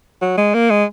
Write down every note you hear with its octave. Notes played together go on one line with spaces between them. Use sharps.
F#3
G#3
A#3
G#3